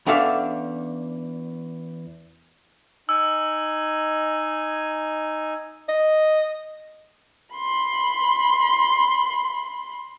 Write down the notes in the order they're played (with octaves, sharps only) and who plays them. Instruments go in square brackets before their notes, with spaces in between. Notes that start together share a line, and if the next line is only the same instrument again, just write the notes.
[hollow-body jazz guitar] E2 C#4 D4 A4 E5 F5
[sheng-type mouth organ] D#4 G#5 [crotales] E6
[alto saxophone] D#5
[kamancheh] B5 C6